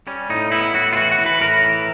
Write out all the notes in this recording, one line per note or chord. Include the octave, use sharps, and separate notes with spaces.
G3 C#4
A2 D#4
B3 E4
A2 F#4
F4
E3 F#4
F#4
E3
B4
A2 A#4
E3